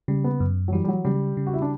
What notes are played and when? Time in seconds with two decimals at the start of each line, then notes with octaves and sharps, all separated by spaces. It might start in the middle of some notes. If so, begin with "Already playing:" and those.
0.08 C#3 G3
0.24 B3
0.40 F#2
0.68 F#3
0.73 E3 G3
0.84 G3
0.88 F#3
1.05 C#3 G3
1.37 C#3
1.47 F#4
1.54 E4
1.62 D4